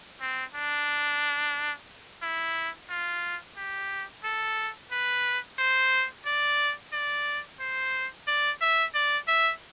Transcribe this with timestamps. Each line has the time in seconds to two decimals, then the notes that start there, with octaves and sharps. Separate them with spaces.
0.21 C4
0.54 D4
2.23 E4
2.90 F4
3.57 G4
4.24 A4
4.92 B4
5.59 C5
6.26 D5
6.93 D5
7.60 C5
8.27 D5
8.61 E5
8.94 D5
9.28 E5